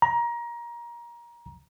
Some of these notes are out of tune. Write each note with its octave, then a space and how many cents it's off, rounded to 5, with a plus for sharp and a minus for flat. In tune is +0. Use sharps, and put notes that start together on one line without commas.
A#5 +25